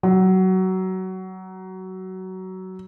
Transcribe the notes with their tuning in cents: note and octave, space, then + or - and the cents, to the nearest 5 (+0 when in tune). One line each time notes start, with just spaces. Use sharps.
F#3 +20